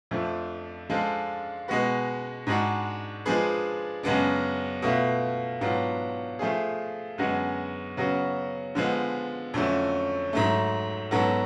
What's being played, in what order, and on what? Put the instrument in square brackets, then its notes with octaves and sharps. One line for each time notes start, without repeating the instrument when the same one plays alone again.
[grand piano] F2 F3 A3 D4
F3 G#3 D4 F4 A4
B2 G#3 B3 F#4 B4
G#2 G#3 D4 F#4
F3 G#3 D4 G#4 B4
F#2 C#3 G#3 B3 D4
B2 A3 F4 B4
G#2 F#3 B3 D4 F4
F3 A3 F4 G#4
F#2 D3 G#3 B3 F#4
C#3 F#3 B3 F#4
D3 F3 G#3 B3
F2 D3 F#3 A3 C#4
G#2 F#3 A3
G#2 F#3 B3 F#4 A4